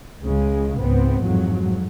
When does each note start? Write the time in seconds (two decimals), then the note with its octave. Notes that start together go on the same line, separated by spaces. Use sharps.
0.22 C#2 C#3 G#3
0.78 C#2 G#2 B3 C4
1.24 A1 F2 G#2 F#3